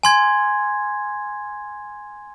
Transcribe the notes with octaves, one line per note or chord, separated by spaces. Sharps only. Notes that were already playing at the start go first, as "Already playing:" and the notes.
G#5 C6 G#6